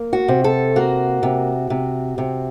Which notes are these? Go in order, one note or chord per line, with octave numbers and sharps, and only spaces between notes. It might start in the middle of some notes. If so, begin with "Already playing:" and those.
Already playing: A#3
F#4
C3
A4
A#3 F#4
C3
C3
C3